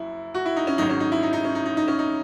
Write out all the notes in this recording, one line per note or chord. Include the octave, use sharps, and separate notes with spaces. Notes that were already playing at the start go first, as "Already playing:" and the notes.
Already playing: F#1 F#2 E4
F#4
E4
D#4
C#4
G#1 G#2 F#3 D#4
C#4
D#4
E4
D#4
D#4
C#4
D#4
D#4
D#4
C#4
D#4